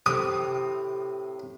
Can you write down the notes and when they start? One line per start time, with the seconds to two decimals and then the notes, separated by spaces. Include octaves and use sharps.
0.06 A2 C3 D#6